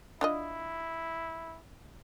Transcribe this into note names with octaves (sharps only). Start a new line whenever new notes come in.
D4 E4 F4 D#5